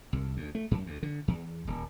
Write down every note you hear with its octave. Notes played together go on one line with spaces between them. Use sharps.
C2
D2
A3
F#2
D2
D3
E2
D#1